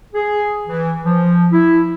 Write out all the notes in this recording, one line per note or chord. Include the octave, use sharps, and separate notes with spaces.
G#4
E3
F3
E4